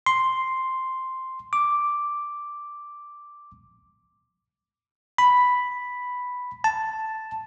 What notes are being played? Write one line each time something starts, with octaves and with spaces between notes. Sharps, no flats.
C6
D6
B5
A5